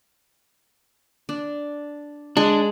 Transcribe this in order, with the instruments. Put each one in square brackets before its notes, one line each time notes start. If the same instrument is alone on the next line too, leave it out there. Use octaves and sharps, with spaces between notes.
[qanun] D4
[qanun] G#3 [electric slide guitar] D4